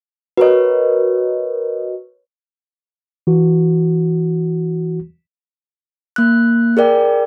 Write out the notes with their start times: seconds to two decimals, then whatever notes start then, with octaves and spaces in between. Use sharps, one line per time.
0.37 F#4 A#4 B4 C#5 D#5
3.27 E3 F#4
6.16 A#3 F#6
6.77 G#4 A#4 D5 G5